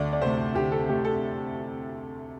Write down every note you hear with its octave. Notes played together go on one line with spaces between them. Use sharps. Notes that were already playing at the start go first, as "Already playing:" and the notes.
Already playing: D2 D5
D5
C3 A3 C5
D2 G4
A4
C3 A3 G4
A4